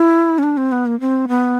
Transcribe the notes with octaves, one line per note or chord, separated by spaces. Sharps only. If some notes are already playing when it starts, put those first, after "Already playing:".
Already playing: E4
C#4
D4
C4
B3
A#3
C4
B3